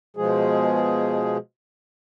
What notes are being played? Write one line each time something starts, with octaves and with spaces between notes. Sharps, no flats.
B2 F3 G#3 G#4